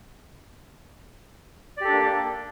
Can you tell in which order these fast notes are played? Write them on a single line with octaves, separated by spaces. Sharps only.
D5 G4 A4 D4 A#3